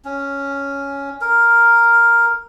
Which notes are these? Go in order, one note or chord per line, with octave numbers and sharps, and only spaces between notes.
C#4
A#4